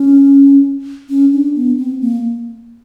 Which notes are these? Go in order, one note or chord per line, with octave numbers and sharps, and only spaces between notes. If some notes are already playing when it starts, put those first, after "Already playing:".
Already playing: C#4
C#4
D4
B3
C4
A#3